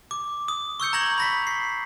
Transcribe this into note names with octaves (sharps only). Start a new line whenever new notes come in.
D6
D#6
C#6 E6 G6 C#7
A#5 C#6 G#6 A#6 F#7
B5 A#6 B6
C7